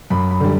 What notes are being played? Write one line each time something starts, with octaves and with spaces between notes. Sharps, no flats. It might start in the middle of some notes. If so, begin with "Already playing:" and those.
F#2 B5
B5
D3 G3